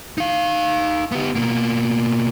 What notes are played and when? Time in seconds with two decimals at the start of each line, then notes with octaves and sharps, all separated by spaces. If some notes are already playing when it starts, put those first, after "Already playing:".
0.18 D#4 F5
1.12 B3 G4
1.35 B2 A#3